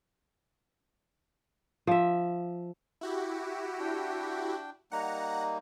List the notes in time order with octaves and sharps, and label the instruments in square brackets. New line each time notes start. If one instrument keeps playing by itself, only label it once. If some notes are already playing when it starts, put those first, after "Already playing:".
[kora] F3 E5
[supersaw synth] E4 F#4 G4
[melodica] D4 G5
[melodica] G3 A#3 D#4 [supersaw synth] F#5 A#5